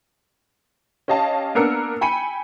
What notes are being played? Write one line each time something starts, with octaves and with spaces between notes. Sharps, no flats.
C#4 G4 D#5 F5 A5
A#3 B3 D4 A#4 E6 C#7
G5 G#5 B5 C#7 D#7